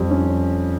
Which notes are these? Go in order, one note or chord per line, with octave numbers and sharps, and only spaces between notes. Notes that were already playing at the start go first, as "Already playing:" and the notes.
Already playing: F2 G3
C#4